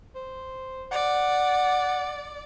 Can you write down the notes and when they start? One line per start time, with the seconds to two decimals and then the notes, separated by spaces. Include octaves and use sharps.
0.15 C5
0.92 D5 F#5